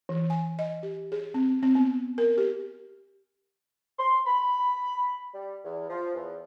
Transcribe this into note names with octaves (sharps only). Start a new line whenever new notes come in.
E3
G#5
D#5
G4
G#4
C4
C4
B3
A#4
G4
C6
B5
G3
E2
F3
E2